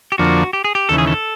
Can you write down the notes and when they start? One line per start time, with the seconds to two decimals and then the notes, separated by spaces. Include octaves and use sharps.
0.12 G4
0.18 F2 D3 F3 A#3 D4 F#4
0.53 G4
0.64 G#4
0.75 G4
0.89 D#2 C#3 E3 A4
0.98 G#4
1.07 A4